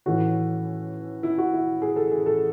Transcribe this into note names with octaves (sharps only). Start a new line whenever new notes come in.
A2 E3 A3 C#4 F#4
E4
F#4
E4
G#4
A4
G#4
A4